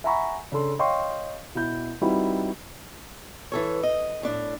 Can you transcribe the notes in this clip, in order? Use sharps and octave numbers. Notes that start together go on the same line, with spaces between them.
E5 F#5 G#5 A#5 B5 C#6
C#3 D4 A4 C6
C#5 D#5 F5 G5 C6 C#6
B2 E4 G6
G3 C4 D#4 E4 F#4 B4
E3 A4 C#5
D#5
A2 D4